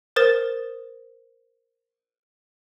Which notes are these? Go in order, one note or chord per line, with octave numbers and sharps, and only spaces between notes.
A#4 C5 D#6 A6 E7